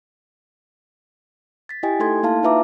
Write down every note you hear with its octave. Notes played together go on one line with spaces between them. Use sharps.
A6 B6
E4 G4 D#5 G5 G#5
A3 D#4 A4 C6 G#6
A#3 E4 F5 A5
D#4 F4 B4 E5 A#5 D6